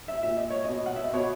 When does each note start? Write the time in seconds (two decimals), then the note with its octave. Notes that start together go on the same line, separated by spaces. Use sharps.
0.08 E5
0.23 A#2 E5
0.37 D#5
0.50 C#5
0.64 B2 D#5
0.86 F#5
0.96 E5
1.04 D#5
1.13 B2 C#5